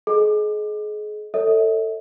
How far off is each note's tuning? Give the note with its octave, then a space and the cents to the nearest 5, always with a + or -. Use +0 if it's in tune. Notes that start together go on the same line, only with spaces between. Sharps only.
G#4 +30 D#5 +0
A4 +20 C#5 +20 E5 -45